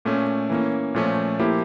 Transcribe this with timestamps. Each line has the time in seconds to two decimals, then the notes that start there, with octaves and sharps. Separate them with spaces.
0.05 A#2 A3 C#4
0.50 E3 A#3 C#4
0.94 A#2 F3 A3 C#4
1.39 F3 A#3 E4 G4